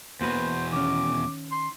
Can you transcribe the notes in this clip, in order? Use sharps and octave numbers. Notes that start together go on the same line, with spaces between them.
E2 B2 A#3 F#4 B4 C5
D#3 C#4 D6
C6